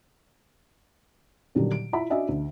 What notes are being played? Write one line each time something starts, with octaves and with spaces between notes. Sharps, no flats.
A#2 D3 D#3 F#3 G3 G4
D7
E4 F4 E5 B5
D4 F#4 D#5 E5 G#5
D2